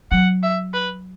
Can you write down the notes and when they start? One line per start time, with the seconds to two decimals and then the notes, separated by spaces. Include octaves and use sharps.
0.11 F#3 F#5
0.43 E5
0.74 B4